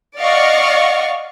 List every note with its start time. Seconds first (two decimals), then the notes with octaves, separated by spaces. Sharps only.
0.19 D5 D#5 F5 F#5 C#6 F6